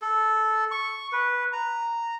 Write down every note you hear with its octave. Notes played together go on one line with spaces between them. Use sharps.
A4
C#6
B4
A#5